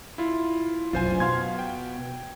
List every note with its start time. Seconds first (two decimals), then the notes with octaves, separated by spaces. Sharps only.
0.18 E4 F4
0.93 F1 B1 F#2 F4 C5 G#5
1.20 B2 F5 C6 G#6
1.59 G5